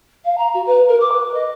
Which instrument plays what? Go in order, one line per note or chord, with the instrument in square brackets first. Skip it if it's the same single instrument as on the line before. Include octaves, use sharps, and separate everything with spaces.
[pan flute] F5
A#5
F#4
B4
A#4
D6
B4
D#5